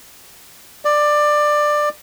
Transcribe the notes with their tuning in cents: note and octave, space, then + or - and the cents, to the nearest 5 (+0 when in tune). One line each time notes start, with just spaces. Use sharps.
D5 +15